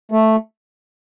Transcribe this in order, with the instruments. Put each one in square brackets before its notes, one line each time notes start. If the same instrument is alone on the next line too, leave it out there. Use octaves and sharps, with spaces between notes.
[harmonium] A3